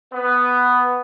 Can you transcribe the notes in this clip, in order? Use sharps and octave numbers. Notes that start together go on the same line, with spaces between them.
B3